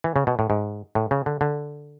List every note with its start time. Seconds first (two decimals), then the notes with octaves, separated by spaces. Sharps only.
0.04 E3
0.16 C#3
0.27 B2
0.39 A2
0.50 G#2
0.95 A2
1.11 C#3
1.26 D3
1.41 D3